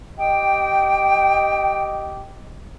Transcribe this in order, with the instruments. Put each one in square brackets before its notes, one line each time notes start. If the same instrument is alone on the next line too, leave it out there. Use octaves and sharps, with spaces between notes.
[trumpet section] G4 D#5 [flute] G5